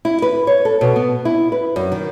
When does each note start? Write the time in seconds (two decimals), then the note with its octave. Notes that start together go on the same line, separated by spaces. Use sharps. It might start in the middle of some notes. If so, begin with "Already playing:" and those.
0.05 E4
0.22 B4
0.47 C#5
0.65 A4
0.81 B2
0.96 B3
1.25 E4
1.52 B4
1.76 F#2
1.92 D#3